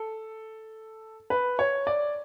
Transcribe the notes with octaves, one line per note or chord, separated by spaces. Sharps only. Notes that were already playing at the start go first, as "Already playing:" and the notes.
Already playing: A4
B4
C#5
D5